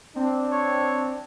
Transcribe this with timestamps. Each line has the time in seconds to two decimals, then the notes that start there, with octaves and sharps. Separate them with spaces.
0.16 C4 D4
0.52 C#5